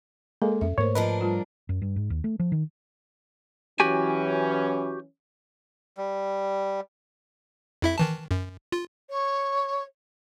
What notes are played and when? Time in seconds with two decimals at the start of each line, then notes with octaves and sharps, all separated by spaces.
0.42 G#3 A#3 A4
0.61 F2 C#4 E5
0.78 G#2 A3 A#3 A#4 C5 C#5
0.95 F3 D4 A#4 B4 D#5
1.21 G3 F4
1.69 F#2
1.82 G2
1.96 G#2
2.10 D#2
2.24 A3
2.39 F3
2.52 D#3
3.80 E3 F#3 C#4 F#4 G4 G#5
5.97 G3
7.82 F2 E4 E5
7.98 D#3 E3 A5
8.31 F#2
8.72 F4
9.10 C#5